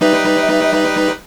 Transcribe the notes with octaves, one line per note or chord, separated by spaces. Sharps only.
G3 D#4 B4 E5